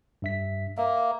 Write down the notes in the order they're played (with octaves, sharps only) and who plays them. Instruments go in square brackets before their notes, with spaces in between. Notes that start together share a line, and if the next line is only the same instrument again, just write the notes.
[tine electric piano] G2 E5 B6
[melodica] A#3 [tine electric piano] E5